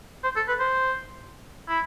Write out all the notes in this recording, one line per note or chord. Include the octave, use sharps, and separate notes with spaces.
C5
A4
B4
C5
E4